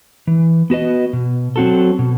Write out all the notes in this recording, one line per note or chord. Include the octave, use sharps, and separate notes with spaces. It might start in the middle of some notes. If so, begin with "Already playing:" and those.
E3
B3 F#4 B4 D#5
B2
F#3 C4 F#4 A4
B2